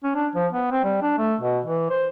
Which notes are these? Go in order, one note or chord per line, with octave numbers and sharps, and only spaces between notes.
C#4
D4
F3
B3
C4
G3
D4
A3
B2
E3
C5